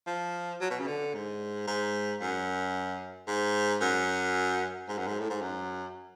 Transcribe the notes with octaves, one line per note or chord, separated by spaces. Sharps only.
F3
F#3
B2
C#3
D3
G#2
G#2
F#2
G#2
F#2
G#2
F#2
G#2
A2
G#2
F#2